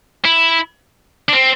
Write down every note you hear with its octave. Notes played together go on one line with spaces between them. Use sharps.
E4
D4
C4